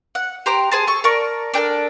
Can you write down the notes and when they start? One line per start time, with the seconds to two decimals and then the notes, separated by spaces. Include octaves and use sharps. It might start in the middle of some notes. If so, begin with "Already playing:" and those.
0.15 F#5
0.46 G4 C5 A#5 D6
0.72 G#4 C5 A5
0.87 A4 C#6
1.04 A#4 D5 A5 C#6
1.54 D4 G4 A4 A#4